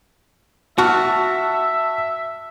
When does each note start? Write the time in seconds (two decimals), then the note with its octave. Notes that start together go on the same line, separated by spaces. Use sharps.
0.78 F#4 E5 A5 C#6 F6